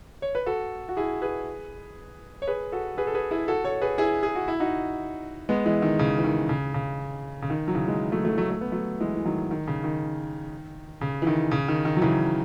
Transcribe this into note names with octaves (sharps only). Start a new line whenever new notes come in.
C#5
B4
F#4 A4
F#4
E4 G#4
G#4 B4
C#5
G#4 B4
F#4 A4
G#4 B4
A4
G#4 B4
E4 G#4
F#4 A4
A4 C#5
G#4 B4
E4 G#4
G#4
F#4
E4
D#4 F#4
G#3 B3
E3 G#3
D#3
C#3
E3
D#3
C#3
C#3
C#3
D#3
F#3
C#3 E3
E3 G#3
F#3 A3
F#3 A3
F#3 A3
A3
B3
F#3 A3
E3 G#3
E3
D#3 F#3
D#3
C#3
D#3
C#3
E3
D#3
C#3
D#3
D#3
F#3
C#3 E3